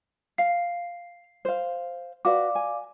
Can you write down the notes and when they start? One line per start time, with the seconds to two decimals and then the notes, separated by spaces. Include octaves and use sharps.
0.38 F5 C7
1.45 C5 F5
2.25 F#4 B4 D5 F5 D6
2.55 G#5